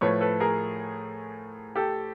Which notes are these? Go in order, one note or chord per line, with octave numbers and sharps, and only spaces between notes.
A2 F3 A3 B4 C#5
A4 B4
G#4 A#4
G4 A4